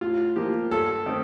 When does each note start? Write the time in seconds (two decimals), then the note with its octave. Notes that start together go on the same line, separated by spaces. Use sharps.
0.01 A2 F4
0.36 F3 A#3 G4
0.71 G2 A4
1.06 D#3 A3 C4